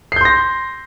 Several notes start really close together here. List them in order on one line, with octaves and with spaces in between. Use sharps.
C7 G6 C6 A#6